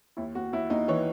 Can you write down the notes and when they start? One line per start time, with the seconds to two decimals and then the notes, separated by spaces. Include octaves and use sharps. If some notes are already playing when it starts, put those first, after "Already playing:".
0.17 D#2 E4
0.35 D#2 F#4
0.53 D#2 E4
0.70 D#2 D#4
0.88 E3 C#5